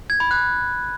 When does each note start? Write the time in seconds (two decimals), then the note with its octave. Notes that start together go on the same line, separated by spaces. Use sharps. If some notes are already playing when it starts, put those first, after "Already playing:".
0.10 G#6
0.20 B5
0.31 F#6